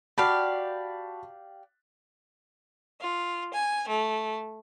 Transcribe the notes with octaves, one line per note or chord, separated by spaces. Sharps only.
F#4 G4 D5 F5 A5 B5
F4
G#5
A3